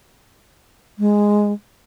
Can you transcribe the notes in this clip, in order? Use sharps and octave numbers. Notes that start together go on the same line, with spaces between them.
G#3